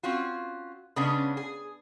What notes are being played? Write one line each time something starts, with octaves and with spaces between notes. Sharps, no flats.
C4 C#4 F4 F#4
C#3 G#3 B3 C#4 D4
G#4